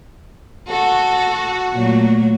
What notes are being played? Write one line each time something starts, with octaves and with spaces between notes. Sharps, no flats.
F#4 A4
A#2 F#3 A3